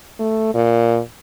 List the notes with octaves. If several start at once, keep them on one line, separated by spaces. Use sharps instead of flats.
A3
A#2